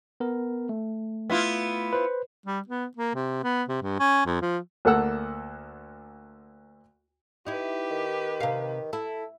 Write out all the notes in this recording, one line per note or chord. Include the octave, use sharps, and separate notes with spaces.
B3 A#4
A3
B3 E4 F4
B4 C5
G3
B3
A#3
C3
B3
C3
G2
C#4
F2
F3
D2 A#3 A4 F#5 E6
D#4 E4 G4 B4
D#3
C3 F5
E4 A4